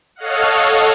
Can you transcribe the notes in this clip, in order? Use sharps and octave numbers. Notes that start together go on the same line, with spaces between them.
A4 C#5 D#5 F5 F#5